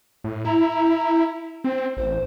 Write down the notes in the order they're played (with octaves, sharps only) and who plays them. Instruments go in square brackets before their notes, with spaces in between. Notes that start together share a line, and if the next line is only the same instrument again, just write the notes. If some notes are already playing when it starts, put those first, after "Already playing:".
[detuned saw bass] A2
[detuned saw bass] E4 [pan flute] A#5
[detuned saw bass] C4 [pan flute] C5
[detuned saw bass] A1 [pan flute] C5